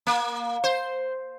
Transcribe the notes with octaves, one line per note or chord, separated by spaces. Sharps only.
A#3
C5